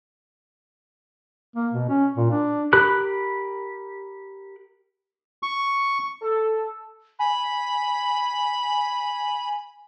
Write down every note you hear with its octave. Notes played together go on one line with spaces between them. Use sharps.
A#3
B2
C#4
A#2
D4
G4 A#4 B5 F#6
C#6
A4
G#5 B5